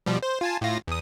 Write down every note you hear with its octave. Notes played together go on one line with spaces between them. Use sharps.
B2 F3 G3
C5
F4 G#5 A5
A2 F4 A#6
E2 D#6